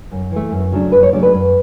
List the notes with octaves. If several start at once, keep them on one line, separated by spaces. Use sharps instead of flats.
F#2
E3 A3
F#2
C#3 F#3 A3 D4
F#2 B4
C#5
C#3 F#3 A3 D4 D5
B4
F#2